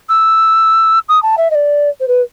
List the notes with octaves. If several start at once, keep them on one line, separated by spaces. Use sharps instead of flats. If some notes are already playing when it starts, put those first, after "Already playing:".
E6
D#6
A5
E5
D#5
D5
C5
B4